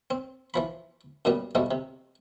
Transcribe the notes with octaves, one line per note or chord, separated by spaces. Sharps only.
C4
E3 F3 B5
F#2 A#2 G3 B3
B2 F3 G3 A3
C3